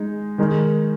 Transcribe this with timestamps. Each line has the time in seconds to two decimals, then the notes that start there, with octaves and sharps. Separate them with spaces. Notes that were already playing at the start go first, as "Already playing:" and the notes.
Already playing: G#3 D#4
0.38 D#3 G#3 D#4 A#4